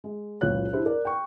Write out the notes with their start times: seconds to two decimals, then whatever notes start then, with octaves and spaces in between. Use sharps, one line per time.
0.04 G#3
0.41 F#1 C#2 A#2 C#3 C#5 F#6
0.73 D4 E4 G4 C5
0.85 A#4 D5
1.05 G5 C#6